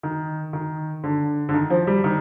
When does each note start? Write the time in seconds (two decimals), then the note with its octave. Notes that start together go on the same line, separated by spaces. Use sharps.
0.03 D#3
0.53 D#3
1.04 D3
1.49 D3
1.54 D#3
1.70 F3
1.87 G3
2.04 D#3